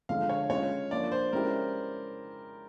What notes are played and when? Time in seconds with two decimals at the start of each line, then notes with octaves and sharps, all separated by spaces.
0.09 D3 F3 G#3 F5
0.29 C#5
0.50 G#3 C#4 F4 C#5
0.91 F3 A#3 D4 F4 D5
1.12 C5
1.33 G#3 C#4 E4 G4 A#4